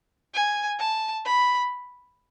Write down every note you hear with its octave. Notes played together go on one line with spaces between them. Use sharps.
G#5
A5
B5